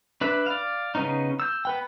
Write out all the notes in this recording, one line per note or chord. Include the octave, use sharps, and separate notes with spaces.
D4 B4 E5 B5
D5 F5
C#3 A#3 B3 C#4 D#4
E6 G6
B3 B4 G5